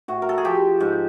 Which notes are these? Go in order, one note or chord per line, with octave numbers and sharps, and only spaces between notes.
A2 F#4
A#4
A4
G#4
F3 G4
G#2